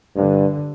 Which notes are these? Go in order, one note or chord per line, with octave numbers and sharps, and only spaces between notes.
G2 D3